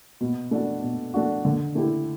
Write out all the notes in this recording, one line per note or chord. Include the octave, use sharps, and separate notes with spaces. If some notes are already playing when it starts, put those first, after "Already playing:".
B2
A3 D4 F#4
B2
A3 D4 F#4
D3
A3 E4 G4